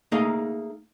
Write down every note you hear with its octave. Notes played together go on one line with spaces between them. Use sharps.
A3 A#3 D#4 G#4 D#5 F5